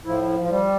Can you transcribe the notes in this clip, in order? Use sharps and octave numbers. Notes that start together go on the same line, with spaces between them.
A2 F3 E4
F3
G3